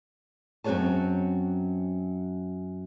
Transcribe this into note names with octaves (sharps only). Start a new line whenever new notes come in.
F#2 C4 F#4 G#4 C#5 A5